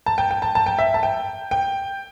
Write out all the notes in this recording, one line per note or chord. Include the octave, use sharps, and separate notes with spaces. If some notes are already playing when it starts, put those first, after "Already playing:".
A5
G5
G5
A5
A5
G5
E5
A5
G5
G5